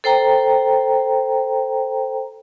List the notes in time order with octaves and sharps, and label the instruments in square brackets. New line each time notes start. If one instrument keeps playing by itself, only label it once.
[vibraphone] A4 C5 G5 A#5